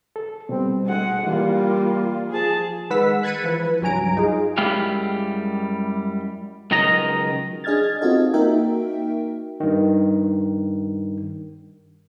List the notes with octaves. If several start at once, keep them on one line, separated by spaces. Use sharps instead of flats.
A4
B2 G3 C4
D2 G#3 F#5
E3 G3 A#3 F4
F3 G#4 A5
D#3 G#3 B4 F#5 E6 B6
F#6 G#6 A6 B6 C#7 D#7
E3 F3 B4
C#2 G2 F#3 G#5 A#5 D7
D#4 F4 G#4
F#2 G3 G#3 E4 G4 F5
C#2 D#3 F#3 D#5 A#5
D4 G#4 D#5 F6 G#6 A6
C4 D#4 F4 F#4 A4 D#5
A#3 D#4 F#4 A#4 E5 G5
G2 D#3